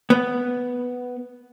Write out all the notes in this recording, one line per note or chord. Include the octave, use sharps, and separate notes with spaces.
B3